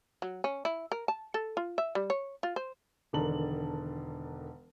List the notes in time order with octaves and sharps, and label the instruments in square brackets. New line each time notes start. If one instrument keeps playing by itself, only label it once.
[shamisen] F#3
C#4
E4
A#4
A5
A4
F4
E5
G3
C#5
F4
C5
[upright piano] E1 D3 D#3 A5 A#5 F#7